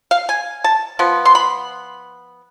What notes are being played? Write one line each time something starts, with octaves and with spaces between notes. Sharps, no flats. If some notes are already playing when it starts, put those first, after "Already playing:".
F5
G#5
A5
F3 B3
C6
B5